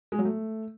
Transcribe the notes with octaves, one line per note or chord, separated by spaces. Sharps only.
G#3
F#3
A3